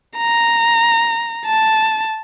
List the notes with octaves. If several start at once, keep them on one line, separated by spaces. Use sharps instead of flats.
A#5
A5